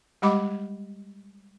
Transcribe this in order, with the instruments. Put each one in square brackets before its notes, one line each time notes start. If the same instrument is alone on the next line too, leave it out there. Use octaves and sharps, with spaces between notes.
[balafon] G3 G#3 G4 D#5 B5 D6